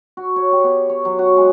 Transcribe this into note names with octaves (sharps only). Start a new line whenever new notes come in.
F#4
C#5
G4
B3
C#5
F#3
F#4
G#3